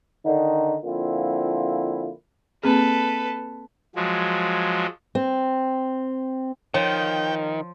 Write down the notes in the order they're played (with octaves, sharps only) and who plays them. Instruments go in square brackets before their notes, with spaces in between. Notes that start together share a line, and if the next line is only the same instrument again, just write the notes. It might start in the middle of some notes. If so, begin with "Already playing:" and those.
[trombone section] D3 D#3 D#4
D3 F3 A#3 C4 E4 F4
[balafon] A#3 C4 G#4 [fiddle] A4 B4
[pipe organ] F3 F#3 G#3
[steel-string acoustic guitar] C4
[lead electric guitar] D#3 [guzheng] F3 [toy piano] C#5 [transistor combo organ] G5